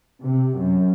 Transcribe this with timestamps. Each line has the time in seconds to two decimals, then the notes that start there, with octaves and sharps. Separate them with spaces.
0.22 C3
0.58 F#2